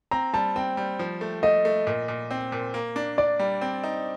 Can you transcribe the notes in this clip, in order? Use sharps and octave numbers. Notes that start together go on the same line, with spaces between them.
C4 A#5
G3 A5
C4 G5
G3
F3
A3
A3 D#5
A3
A#2
A#2
C4
A#2
A#3
D4
D4 D5
G3
C4
D#4